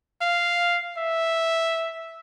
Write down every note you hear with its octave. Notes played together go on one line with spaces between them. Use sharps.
F5
E5